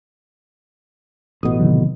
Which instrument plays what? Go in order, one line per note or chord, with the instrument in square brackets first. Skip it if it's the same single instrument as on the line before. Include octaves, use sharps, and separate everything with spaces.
[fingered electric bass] A1 B2 [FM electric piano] D#6
[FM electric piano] C3 D#3 F#3